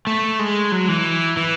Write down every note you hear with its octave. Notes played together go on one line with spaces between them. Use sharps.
A3
G#3
F#3
E3
E3